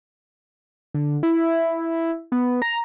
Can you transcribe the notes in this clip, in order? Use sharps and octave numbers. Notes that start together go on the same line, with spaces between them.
D3
E4
B3
A#5